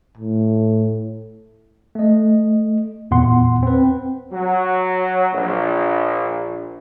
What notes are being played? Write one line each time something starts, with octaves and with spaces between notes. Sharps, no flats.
A2
A3 D#5
E2 A#2 F#5 C6
C4 B4
F#3
A#1